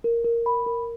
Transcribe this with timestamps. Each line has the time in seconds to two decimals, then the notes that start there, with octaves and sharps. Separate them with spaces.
0.04 A#4
0.25 A#4
0.46 B5
0.66 A#4